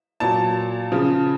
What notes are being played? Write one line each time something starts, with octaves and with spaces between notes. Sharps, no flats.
A#2 F#3 A5
C#3 F3